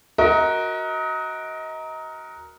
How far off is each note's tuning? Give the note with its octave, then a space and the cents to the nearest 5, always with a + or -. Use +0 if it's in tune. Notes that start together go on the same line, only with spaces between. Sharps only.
F#4 +0 A#4 +0 D#5 +30